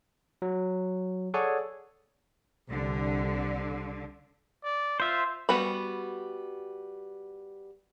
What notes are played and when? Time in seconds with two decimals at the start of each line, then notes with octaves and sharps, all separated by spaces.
0.42 F#3
1.34 G#4 A4 C#5 D5 F#5 G#5
2.70 C2 D3
4.64 D5
5.00 F4 C5 E5
5.49 G3 B3 F#4 B5